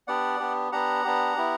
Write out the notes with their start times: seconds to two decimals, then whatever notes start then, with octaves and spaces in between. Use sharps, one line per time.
0.08 B3 D4 G4 D5 F#5
0.40 B3 D4 G4
0.72 B3 D4 G4 F#5 A#5
1.04 B3 D4 G4
1.36 B3 E4 G4